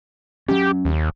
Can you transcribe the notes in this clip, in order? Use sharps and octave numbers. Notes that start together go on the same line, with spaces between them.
F#3 C#4 G4
D#2